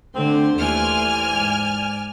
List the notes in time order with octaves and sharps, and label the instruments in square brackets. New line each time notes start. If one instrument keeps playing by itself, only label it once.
[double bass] D3 A3 [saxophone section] C4 [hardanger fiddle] C5 C6
[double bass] D#2 A3 [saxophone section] E3 [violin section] D5 G#5 F6
[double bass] G#2